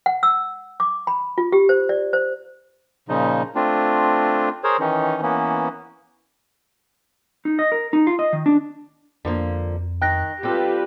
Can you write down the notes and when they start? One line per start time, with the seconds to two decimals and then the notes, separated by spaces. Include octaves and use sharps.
0.06 F#5
0.23 E6
0.80 D6
1.07 B5
1.38 F4
1.52 G4
1.69 C5
1.89 D5
2.13 C5
3.09 A#2 C#3 F3 D#4
3.55 A3 C4 D4 F4
4.64 G#4 A#4 C5 C#5
4.80 D#3 E3 C#4 D#4
5.22 E3 A#3 B3 C#4
7.45 D#4
7.59 D#5
7.72 A#4
7.93 D#4
8.07 F4
8.19 D#5
8.33 D#3
8.46 D4
9.25 F2 D3 F3 A#3
10.02 D#3 G5 F#6 A#6
10.43 G3 C4 F4 G4 A4 B4